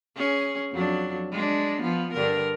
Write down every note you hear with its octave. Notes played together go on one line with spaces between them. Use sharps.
C#4 G#4
F2 F#3 D4
G#3 D4
F3 B3
G2 D3 A#4